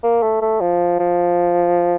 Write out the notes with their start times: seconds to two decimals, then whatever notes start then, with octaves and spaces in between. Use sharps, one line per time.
0.03 A#3
0.22 A3
0.42 A3
0.61 F3
0.99 F3